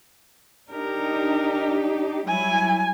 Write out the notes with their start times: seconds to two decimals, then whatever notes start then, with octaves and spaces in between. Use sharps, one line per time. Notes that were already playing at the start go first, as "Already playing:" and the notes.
0.72 D4 D#4 G4 A#4
2.28 F#3 G3 E4 G#5